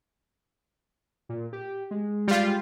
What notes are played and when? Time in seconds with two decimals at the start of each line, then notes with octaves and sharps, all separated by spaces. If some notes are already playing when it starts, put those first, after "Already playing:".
1.29 A#2
1.53 G4
1.91 G#3
2.28 G3 F4